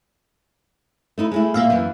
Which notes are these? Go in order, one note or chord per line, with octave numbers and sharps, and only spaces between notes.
A3 D#4 E4
G#3 A3 E4
A#2 A#3 E5 F5
F#2 E3